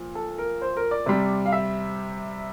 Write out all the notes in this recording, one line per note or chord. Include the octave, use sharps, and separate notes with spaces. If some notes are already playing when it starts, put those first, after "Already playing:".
Already playing: A#2 F3
A4
A#4
C5
A#4
D5
C3 G3
F5
E5